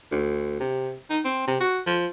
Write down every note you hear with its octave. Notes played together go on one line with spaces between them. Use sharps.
D2
C3
D#4
C4
C3
F#4
F3